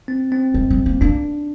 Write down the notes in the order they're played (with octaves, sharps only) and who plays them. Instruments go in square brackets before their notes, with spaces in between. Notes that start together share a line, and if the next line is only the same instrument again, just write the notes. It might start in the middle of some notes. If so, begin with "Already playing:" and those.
[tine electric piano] C4
C4
[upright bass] G#3
G#3
A#3
[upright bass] A#3 [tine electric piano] D4